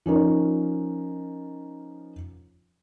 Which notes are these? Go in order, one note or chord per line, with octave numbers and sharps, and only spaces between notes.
F3 C#4 D#4 A#4